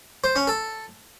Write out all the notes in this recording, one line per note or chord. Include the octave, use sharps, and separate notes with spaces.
C5
C#4
A4